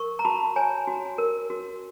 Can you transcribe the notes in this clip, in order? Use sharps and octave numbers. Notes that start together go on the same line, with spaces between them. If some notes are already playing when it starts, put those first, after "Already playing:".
Already playing: A#4 C#6
A#5
F#4 A5 B5
C#5 G#5 A#5
F#4
A#4
F#4